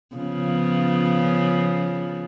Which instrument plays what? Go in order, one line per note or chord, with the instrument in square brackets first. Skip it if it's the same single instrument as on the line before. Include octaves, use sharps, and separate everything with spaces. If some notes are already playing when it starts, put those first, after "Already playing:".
[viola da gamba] C#3 F3 B3